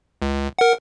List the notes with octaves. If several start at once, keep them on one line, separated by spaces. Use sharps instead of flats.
C#2
A#4 F#5